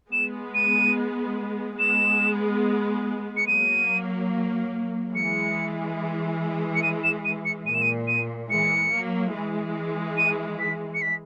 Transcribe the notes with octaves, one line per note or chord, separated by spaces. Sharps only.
G#3 B3 E7
D#7
G#3 B3 E7
C#7
F#3 A#3 D#7
E3 G#3 C#7
C#7
D#7
E7
D#7
C#7
A#2 D#7
E7
D#7
D#7
E3 G#3 C#7
F#3 A#3
E3 G#3
D#7
B6
C#7
B6